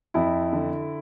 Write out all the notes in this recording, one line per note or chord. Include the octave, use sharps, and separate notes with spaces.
F2 E4
D3